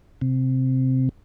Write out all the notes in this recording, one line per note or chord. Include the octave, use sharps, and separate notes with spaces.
C3